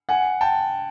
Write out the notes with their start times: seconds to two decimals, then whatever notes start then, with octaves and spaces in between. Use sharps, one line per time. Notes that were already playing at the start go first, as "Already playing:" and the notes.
0.09 F#5 G#5
0.41 G5 A5